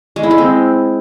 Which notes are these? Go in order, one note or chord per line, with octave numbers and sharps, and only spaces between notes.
G#3
E4
G#3
C4